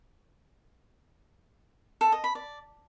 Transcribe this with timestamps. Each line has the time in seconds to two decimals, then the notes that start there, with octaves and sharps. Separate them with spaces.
2.01 A4
2.12 D#5
2.24 B5
2.35 D5